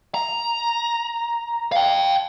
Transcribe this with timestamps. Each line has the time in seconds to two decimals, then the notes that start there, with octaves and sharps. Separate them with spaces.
0.14 A#5
1.72 F5 G5